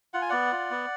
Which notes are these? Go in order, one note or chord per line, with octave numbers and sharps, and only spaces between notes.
F4 F#5
G#5
B3 D5 F#5
F4
B3